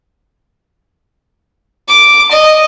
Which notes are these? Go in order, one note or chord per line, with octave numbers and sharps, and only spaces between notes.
D6
D#5